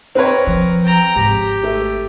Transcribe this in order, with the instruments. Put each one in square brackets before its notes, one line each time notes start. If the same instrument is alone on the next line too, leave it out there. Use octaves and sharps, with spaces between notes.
[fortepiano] C4 B4 C#5 [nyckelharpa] A#4
[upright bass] F3
[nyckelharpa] G5 A#5
[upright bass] G#1 [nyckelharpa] G4
[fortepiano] A3